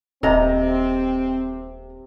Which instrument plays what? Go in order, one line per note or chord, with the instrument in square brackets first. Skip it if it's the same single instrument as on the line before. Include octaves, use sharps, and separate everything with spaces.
[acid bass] D#1 [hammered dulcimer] C3 [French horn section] C4 [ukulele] D#5 A#5